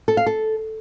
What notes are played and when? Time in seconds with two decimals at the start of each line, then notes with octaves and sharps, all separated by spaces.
0.08 A4
0.17 F5
0.26 A4